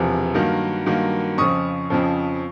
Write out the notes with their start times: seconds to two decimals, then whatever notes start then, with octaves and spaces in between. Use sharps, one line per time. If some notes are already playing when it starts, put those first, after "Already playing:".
Already playing: E1 E2 C3 F3
0.35 G2 D#3 F#3 A#3
0.86 G2 D#3 F#3 A#3
1.38 F2 C#3 F3 C#6 D#6
1.90 F2 C#3 F3